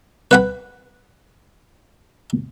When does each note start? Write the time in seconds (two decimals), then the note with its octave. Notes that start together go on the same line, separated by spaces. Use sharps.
0.31 B4 F#5 B5